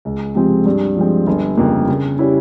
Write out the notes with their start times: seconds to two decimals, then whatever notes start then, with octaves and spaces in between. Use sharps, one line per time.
0.05 C#2
0.35 C3 F3 G#3 C4
0.66 G2
0.97 F3 G#3 C4
1.27 G1
1.57 F2 C#3 F3 A#3
1.88 C#3
2.19 G3 C#4 E4